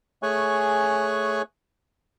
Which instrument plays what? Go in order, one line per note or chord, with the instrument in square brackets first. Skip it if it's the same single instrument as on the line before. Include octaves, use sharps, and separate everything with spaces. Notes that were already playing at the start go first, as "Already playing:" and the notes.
[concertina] A3 G#4 C#5 G#5 C#6 F#6